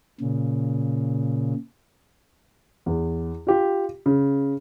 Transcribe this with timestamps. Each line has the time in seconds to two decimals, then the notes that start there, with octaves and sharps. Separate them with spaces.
0.21 A#2 C#3
2.86 E2
3.47 F4 G4
4.06 C#3